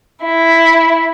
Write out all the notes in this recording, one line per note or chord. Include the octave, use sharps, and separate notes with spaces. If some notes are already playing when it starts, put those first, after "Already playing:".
E4